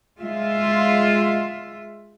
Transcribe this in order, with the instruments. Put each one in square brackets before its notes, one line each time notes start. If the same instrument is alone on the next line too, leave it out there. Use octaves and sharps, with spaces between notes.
[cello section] G#3 F4 E5